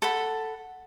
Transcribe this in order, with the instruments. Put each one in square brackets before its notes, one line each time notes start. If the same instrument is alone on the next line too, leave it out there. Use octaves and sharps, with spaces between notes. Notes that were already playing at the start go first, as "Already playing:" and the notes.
[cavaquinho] A4 F#5 B5